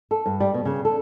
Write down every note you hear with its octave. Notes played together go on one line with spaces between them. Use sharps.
A4
G2
G3
B2
C#3
A4